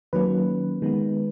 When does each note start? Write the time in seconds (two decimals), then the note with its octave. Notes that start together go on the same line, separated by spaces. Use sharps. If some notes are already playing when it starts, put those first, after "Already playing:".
0.13 D#3 F#3 A#3 C#4 B4
0.82 D#3 G#3 B3